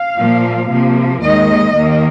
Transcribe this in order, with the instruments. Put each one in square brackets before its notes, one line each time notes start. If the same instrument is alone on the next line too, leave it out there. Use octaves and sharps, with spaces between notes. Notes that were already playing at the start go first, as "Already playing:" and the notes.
Already playing: [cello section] F5
A#2 F3 A#3
C3 F3 A#3
D#2 D#3 G#3 D#5
D#2 D#3 A#3